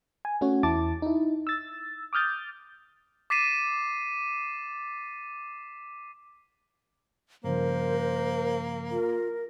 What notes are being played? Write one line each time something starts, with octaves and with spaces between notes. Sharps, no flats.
G#5
A3 C#4 F#4 C#5
E2 E4 A5 D6 A6
D#4 E4
E6 A6
D6 D#6 F6 G6 A6
D6 A6 B6 C7 D#7 E7
G2 C#3 F3 A#3 A#4 C5
F4 A#4